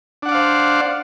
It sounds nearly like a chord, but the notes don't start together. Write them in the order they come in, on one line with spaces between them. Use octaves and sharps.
D4 F#5 D5 F5 C5